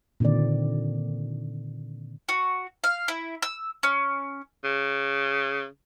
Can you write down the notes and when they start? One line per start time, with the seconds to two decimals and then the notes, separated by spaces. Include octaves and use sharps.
0.20 A#2 D3 D#3 C4 D5
2.29 F#4
2.84 F5
3.08 E4
3.42 E6
3.83 C#4
4.65 C#3